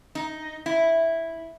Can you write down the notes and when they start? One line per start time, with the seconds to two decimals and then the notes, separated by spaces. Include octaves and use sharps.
0.15 D#4
0.66 E4